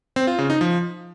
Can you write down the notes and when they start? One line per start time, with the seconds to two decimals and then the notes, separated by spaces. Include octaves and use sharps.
0.16 C4
0.27 F4
0.39 C#3
0.50 D#4
0.61 F3